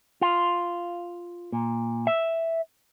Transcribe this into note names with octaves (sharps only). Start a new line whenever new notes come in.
F4
A#2
E5